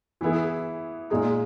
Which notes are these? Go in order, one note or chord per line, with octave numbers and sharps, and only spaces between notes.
E3 B3 E4 G#4
A#2 G#3 D#4 G#4